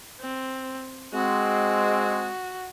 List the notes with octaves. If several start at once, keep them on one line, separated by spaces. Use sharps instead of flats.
C4
G#3 C4 F#4